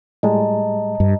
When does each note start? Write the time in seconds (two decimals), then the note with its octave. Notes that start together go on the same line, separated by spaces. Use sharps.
0.23 A2 G3 G#3 D#5 A5 A#5
1.00 G2